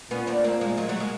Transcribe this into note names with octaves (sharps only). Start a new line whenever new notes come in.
A#2 B3 C#4
C4 D4
A#3 C4
G#3 A#3
F#3 G#3
F#3 G#3
G#3 A#3